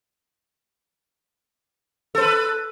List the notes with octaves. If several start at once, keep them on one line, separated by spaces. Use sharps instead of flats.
A4 B4 C5